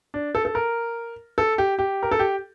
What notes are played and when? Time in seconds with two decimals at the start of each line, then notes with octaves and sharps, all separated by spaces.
0.14 D4
0.35 A4
0.45 A4
0.55 A#4
1.38 A4
1.58 G4
1.79 G4
2.03 A#4
2.11 A4
2.19 G4